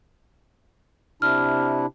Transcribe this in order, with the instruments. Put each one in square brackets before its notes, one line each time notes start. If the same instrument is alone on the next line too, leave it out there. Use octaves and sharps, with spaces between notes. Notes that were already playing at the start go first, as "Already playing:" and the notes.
[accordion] C3 D4 E4 [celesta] F6